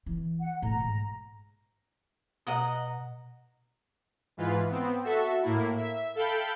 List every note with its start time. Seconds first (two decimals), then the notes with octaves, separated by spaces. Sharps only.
0.06 E3
0.40 F#5
0.62 A2 A#5
0.80 G#2
2.47 B2 D#5 F#5 A#5
4.37 G#2 E3 F4 B4
4.69 B3 C4
5.04 F#4 A4 E5
5.42 A2 A#3 E4
5.77 E5
6.15 A4 F5 G5 B5 G6